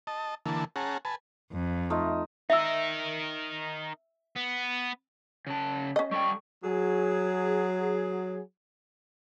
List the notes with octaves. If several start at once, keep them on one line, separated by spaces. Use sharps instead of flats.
D#5 A5
D3 E3 A#3 A5
C#4 G#4 F#5 A5 A#5
B4 G#5 A5
F2
A3 D#4 F4
D#4 A#4 E5 E6
B3
C#3 A5
C#4 D#5
G3 A4 G5 C#6
F#3 G#4